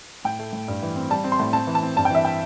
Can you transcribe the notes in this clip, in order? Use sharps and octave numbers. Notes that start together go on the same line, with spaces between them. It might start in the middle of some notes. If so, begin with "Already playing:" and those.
A2 G5
A3
A2
G2
E3
C4
G3 A5
C4
C6
A2
C4 A5
E3
A5
C4
G2 A5
G5
E3 E5
G5